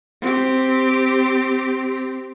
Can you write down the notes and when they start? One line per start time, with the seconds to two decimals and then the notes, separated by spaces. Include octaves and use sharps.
0.22 C4 G4